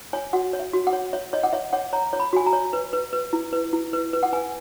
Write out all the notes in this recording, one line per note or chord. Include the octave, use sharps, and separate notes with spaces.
C#5 G#5
F#4 F#5
C#5
E5
F#4
F#5
C#5
C#5 E5
C#5 D#5
F#5
C#5 E5
C#5 F#5
C#5 A#5
C#5
B5
F#4 G#5
A#5
C#5
B4
B4
B4
E4
B4
E4
B4
B4
F#5
B4 G#5